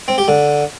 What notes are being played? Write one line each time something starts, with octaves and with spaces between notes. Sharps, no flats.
C4
G4
D3